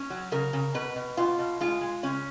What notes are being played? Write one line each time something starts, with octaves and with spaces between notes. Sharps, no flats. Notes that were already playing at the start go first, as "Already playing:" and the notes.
Already playing: C#4
F#3
C#3 A#4
C#3
B2 B4
B2
B2 F4
B2
G#3 F4
G#3
C#3 C#4